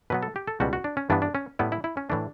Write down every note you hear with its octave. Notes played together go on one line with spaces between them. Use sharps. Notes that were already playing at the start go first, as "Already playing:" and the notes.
B2 F#3 B3 B4
A4
G4
A4
C#2 B2 G3 F#4
F#4
D4
C#4
G2 E3 B3 D4
D4
C#4
A2 G3 B3 E4
E4
E4
C#4
A2 E3 A3 D4